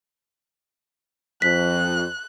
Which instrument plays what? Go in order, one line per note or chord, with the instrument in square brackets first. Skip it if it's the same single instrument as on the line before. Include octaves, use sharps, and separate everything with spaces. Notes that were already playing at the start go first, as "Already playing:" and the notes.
[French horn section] F2 F3 [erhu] F#6 [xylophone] B6